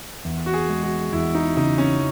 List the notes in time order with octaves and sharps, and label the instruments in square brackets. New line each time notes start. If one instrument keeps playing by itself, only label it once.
[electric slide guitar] E2
[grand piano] F#4
G#4
[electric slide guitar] G#3
[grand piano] F#4
[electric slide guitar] E2 [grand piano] E4
[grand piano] D#4
[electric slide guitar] C#3 [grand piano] D#4
[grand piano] C#4